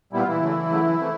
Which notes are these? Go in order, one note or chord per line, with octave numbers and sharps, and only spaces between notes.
A#2 G3 B3 E4
F4
E3 E4
C#3 F#3 A3
C#3 F#3 A3
C3 E3 A3